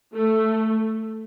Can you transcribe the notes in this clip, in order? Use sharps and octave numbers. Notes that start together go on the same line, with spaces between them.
A3